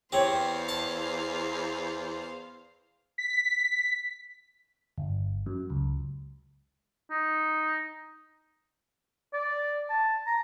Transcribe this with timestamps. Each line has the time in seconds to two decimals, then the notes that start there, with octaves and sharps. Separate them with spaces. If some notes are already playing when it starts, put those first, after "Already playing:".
0.12 E2 C4 G4 C5 C#5 F5
0.69 A5
3.18 B6
4.98 G1
5.46 F#2
5.70 C#2
7.10 D#4
9.33 D5
9.90 A5
10.27 A#5